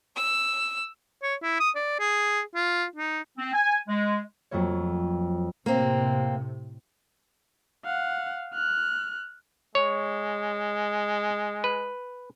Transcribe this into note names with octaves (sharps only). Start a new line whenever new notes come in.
E6
C#5
E4
D#6
D5
G#4
F4
D#4
C4
G#5
G#3
F2 F#3 A3 A#3 C#5
A2 C3 A#3 C4
F5 F#5
F6 F#6
G#3 C#5
B4